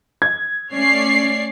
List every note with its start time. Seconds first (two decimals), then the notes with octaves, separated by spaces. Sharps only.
0.22 G#6
0.73 A3 C#4 C#5 D5 C7